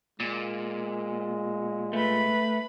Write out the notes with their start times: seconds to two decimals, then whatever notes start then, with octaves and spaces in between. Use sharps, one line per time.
0.20 A#2 G#3
1.93 A3 B4 B5